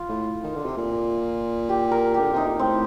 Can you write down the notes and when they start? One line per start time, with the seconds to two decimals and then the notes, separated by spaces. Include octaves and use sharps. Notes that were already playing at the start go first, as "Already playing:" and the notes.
Already playing: F4
0.09 A2
0.43 D#3
0.55 D3
0.66 C3
0.77 A#2
1.69 G4
1.91 A#4
2.14 G4
2.21 D3
2.33 C3 D#4
2.47 A#2
2.59 A2 C4